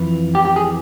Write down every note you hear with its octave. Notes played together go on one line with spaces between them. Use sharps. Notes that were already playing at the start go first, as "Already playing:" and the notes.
Already playing: F2 E3
G4
G4
G#4